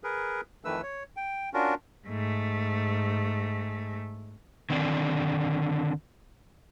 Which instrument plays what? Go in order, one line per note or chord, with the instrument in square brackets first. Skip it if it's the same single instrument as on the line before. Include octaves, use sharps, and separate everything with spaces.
[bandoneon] G#4 A#4 B4
F2 D#3 E3 A3 B4 E6
C#5
G5
C#4 D4 F4 F#4 A#4
[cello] G#2 A3
[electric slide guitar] D3 D#3 C4 D5